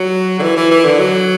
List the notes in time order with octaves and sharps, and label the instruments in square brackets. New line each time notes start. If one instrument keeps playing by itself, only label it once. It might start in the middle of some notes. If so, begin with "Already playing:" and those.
Already playing: [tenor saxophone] F#3
D3
E3
E3
E3
D3
F#3